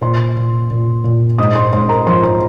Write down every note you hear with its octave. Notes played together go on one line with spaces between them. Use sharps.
A#2 C5 C6
A#2
A#2
A#2
G#2 D#5 D#6
C5 C6
G#2 C5 C6
A#4 A#5
F3 C5 C6
C5 C6